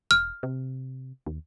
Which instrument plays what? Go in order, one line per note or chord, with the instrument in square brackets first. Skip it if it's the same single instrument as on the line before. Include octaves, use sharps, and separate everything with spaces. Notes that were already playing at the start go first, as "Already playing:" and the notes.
[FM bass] E1 [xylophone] F6
[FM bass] C3
D#2